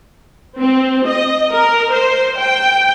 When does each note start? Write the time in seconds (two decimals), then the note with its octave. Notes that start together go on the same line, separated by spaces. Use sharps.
0.59 C4
1.07 D#5
1.53 A#4
1.92 C5
2.38 G5